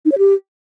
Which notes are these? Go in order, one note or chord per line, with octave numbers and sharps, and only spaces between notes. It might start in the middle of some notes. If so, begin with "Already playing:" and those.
D#4
C#5
G4